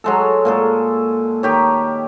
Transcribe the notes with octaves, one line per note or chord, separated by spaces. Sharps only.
F#3 G#3 A4
A#2 G#3 A4
D#3 G4 C#5